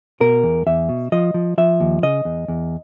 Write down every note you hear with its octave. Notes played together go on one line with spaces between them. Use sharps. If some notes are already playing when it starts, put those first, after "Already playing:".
B2 A#4
E2
E2 E5
B2
F3 D#5
F3
F3 E5
D#2
C#3 D#5
E2
E2